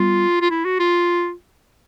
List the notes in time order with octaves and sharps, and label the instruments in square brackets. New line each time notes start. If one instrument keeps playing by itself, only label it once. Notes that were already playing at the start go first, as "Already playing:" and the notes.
Already playing: [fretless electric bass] G3 B3 [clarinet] F4
[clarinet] F4
E4
F#4
F4